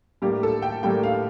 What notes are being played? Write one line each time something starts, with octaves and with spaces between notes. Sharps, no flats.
A2 G3 A#3 G4
A4
G5
A2 G3 A#3 G5
F5